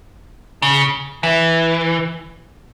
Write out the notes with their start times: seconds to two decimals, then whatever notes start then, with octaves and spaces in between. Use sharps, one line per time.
0.62 C#3
1.23 E3